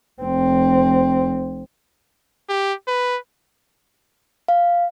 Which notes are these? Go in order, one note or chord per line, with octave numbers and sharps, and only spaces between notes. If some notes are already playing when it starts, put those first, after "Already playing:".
F1 C4
G4
B4
F5